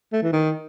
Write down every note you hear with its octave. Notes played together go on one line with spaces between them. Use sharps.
A3
E3
D#3